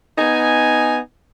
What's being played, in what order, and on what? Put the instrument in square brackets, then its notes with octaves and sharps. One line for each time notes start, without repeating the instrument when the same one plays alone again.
[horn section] B3 D#4 G#5